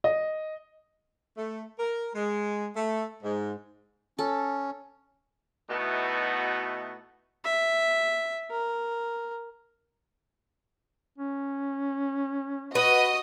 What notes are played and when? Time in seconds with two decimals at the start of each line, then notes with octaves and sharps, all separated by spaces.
0.04 D#5
1.37 A3
1.79 A#4
2.15 G#3
2.76 A3
3.23 G#2
4.19 C#4 A4
5.70 B2 A3 B3 D#4 E4 F#4
7.44 E5
8.51 A#4
11.18 C#4
12.75 F#4 B4 D#5 D#6